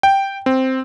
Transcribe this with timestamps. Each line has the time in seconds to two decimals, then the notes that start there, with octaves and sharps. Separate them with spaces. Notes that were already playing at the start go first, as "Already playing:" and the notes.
0.03 G5
0.46 C4